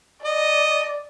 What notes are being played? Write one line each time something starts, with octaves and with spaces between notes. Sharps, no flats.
D5 D#5